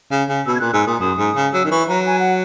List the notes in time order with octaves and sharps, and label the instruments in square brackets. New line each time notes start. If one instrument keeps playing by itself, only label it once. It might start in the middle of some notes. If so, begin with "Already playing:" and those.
[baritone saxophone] C#3
C#3
[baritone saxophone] B2 [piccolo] E6
[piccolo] G#6
[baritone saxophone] A#2 [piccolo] F#6
[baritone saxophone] G#2 [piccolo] E6
[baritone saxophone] A#2 [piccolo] D#6
[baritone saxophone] F#2 [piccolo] D#6
[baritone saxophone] G#2
C#3
[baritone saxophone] F#3 [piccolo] E6
[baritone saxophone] D#3
[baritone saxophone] E3 [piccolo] C#6
[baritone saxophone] F#3 [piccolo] A#5
[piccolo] G#5
F#5